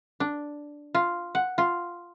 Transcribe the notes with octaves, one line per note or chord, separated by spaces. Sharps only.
D4
F4
F#5
F4